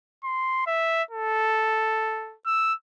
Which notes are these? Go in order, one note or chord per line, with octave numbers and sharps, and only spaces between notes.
C6
E5
A4
E6